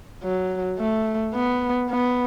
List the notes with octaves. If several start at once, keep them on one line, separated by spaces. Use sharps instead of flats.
F#3
A3
B3
B3